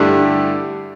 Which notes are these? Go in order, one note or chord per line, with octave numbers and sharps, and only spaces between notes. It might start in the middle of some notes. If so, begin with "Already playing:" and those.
Already playing: G2 D3 A3 E4 G4